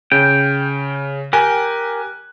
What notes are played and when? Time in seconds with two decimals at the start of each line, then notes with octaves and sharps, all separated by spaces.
0.12 C#3 G5
1.33 G4 A#4 G5 G#5 F#6